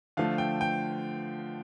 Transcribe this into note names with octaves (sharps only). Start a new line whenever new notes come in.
D3 F3 A3 F5
G5
G5